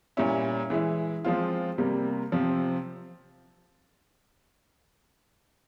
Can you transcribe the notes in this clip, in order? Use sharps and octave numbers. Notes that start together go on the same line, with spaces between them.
A#2 G3 C#4 E4
E3 G#3 E4
F3 G#3 C4 F4
C3 G3 A#3
C3 F3 C4